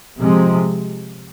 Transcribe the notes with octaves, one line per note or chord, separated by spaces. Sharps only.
C3 F3 G#3